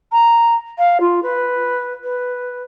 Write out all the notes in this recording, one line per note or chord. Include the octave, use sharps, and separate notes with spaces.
A#5
F5
F4
B4
B4